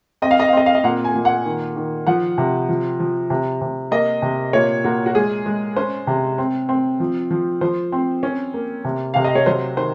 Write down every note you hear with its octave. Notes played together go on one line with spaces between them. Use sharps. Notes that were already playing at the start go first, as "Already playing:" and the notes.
C4 D#5
F5
D#5
F5
C4 D#5
F5
D#5
A#2 F#5
G#5
A#2
F#5
D#3
D#3
F3 F#5
C3
F3
F3
C3
C3
A#3 D#5
C3
A#2 C#5
A#2 F#4
F#4
G#3 G#4
G#3
C#4 C5
C3
C4
C4
F3
F3
F3 C5
C4
C#4
A#3
C3
C3 F5
D#5
C#5
F#3 C5
D#3 C5